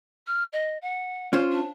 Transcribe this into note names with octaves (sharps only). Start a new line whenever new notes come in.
F6
D#5
F#5
C#4 F4 C5
D4